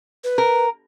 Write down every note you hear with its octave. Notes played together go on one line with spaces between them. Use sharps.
B4
A#4